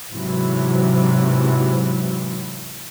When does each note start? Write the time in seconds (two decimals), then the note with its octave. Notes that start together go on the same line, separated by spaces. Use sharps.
0.11 G#2 C3 E3 F#3